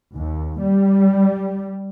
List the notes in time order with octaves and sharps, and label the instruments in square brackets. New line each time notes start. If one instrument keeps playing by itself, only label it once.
[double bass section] D#2
G3